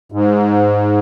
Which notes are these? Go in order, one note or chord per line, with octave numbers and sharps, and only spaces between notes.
G#2